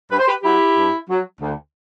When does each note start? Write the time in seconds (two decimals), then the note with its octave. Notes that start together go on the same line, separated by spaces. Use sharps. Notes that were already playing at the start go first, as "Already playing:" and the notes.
0.10 G2 B4
0.18 C5
0.27 G4 B4
0.43 F#3 E4 G4
0.75 G2
1.08 F#3
1.41 D2